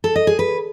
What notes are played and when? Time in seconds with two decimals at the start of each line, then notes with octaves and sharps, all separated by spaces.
0.04 A4
0.16 D#5
0.27 G#4
0.39 B4